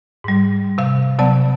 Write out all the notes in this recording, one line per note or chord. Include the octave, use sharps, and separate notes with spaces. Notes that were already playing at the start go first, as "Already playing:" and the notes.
G#2 G3
C3 F5
C3 F#3 B3 D5 A5